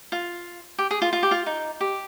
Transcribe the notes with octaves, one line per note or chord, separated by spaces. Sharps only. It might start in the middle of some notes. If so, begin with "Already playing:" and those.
F4
G4
G#4
F4
F4
G4
F4
D#4
G4